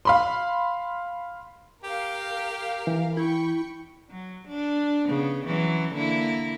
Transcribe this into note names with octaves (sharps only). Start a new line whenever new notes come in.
F5 B5 C6
G4 A#4 F5
E3
E4 G5 B5 C#6
F#3
D4
C#3 B3
E3 F#3 C#4
D3 A#3 E4